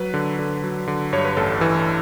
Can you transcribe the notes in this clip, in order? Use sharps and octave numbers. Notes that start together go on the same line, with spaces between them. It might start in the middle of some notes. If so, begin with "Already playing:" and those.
Already playing: F#3 B4
D3
D3
F#3
D3
G2 C#5
B4
A1 A4
E3